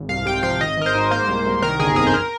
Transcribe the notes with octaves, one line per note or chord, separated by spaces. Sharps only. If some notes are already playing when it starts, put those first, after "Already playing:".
Already playing: G#1
C2 F5
C3 G5
F3 F5
G#1 D#5
G#1 A#4
C5
G#2
A#3 C5
C2
C2
D#3 A#4
G1 G#4
F2 G#4
C5
A#4